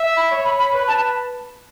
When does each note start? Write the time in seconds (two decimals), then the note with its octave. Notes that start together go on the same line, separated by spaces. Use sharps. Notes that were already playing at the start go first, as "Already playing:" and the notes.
Already playing: E5
0.17 B5
0.31 C#5
0.45 B5
0.59 B5
0.74 B4
0.88 A5